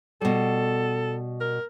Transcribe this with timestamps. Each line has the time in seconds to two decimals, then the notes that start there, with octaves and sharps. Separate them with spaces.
0.21 B2 G3 A4
1.41 A#4